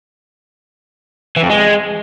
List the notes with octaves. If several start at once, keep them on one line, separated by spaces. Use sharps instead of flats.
E3
F2
G#3